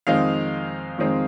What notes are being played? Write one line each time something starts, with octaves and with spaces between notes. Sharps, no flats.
F2 D#3 G#3 C4 D#4 F5
F2 D#3 G#3 C4 D#4